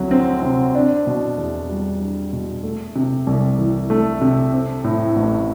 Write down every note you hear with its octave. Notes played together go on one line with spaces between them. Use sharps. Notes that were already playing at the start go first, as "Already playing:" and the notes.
Already playing: D2 C3 F#3
C4
C3
D4
B2
E2
G3
D4
B2
A3
C3
C2
E3
A3
C3
C4
A2
A1